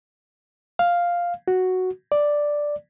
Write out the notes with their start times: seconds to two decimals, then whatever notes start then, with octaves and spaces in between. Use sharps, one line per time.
0.79 F5
1.48 F#4
2.12 D5